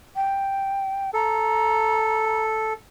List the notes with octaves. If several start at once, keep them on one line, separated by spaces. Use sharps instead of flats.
G5
A4 A#5